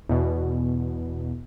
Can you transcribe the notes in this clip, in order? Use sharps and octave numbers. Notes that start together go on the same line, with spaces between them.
E2 B2